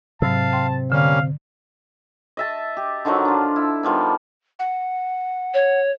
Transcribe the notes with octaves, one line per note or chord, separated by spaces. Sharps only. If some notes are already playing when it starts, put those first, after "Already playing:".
G#2 C3 F#3 F5 A5 E6
G5 C6
D3 G3 A#3 C#4 F5
D#5 E5 A5
G4
D3 D#3 F3 F#3
D4 F4
E4
D#3 F3 G3 B3
F#5
C#5